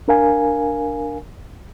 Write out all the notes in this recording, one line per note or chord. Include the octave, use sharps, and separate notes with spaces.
D4 A#4 F5 G#5